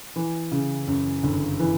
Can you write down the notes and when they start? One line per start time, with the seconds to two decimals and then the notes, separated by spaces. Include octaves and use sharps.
0.16 E3
0.52 C#3
0.87 F#2
1.23 G1
1.60 E3